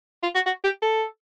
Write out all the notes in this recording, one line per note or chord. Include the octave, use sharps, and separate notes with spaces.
F4
F#4
F#4
G4
A4